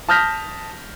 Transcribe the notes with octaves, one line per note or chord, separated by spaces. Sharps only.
A5 D#6 F6 G6 A#6 B6